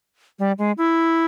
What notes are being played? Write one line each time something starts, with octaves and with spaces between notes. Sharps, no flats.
G3
G#3
E4